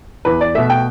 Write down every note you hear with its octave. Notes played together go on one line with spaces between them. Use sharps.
E2 B4
D5
B2 A3 E5
G5